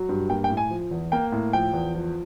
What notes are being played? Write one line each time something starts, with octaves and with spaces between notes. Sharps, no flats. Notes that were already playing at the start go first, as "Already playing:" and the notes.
Already playing: F#3
G2
A#3 G5
G5
A2
G#5
F3
E2
A#3 G5
A2
F3 G5
E2
F3